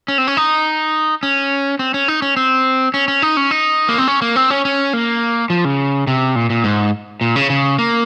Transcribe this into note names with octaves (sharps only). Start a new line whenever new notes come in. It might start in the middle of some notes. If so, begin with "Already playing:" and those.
C#4
C4
C#4
D#4
C#4
C4
C#4
D#4
C#4
C4
C#4
C#4
D#4
C#4
D#4
A#3
C4
C#4
A#3
C4
C#4
C#4
A#3
F3
C#3
C3
A#2
A#2
G#2
A#2
C#3
C#3
A#3